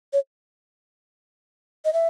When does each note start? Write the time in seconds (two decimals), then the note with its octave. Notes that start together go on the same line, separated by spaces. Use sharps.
0.13 C#5
1.85 D#5
1.93 E5